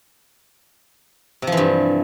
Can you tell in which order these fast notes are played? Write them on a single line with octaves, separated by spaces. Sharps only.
C3 F3 E3 G2